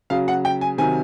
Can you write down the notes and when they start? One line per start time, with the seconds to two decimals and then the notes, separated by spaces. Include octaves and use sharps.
0.10 C#3 F#3 F5
0.28 F#5
0.45 G5
0.61 G#5
0.78 C3 D#3 F#3 G#5